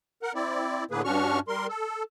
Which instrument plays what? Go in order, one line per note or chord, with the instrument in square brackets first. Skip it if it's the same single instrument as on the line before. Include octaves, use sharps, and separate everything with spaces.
[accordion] A#4 F#5
C4 E4 D5
A2 D3 A#3 G#4 B4
G2 C#4 D4 F#4 C#6 F6
G3 A#4 C6
A4